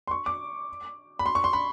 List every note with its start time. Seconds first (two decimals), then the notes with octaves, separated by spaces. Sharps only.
0.07 C6
0.11 C#6
0.26 D6
1.19 B5
1.26 C6
1.35 C#6
1.44 C6
1.53 B5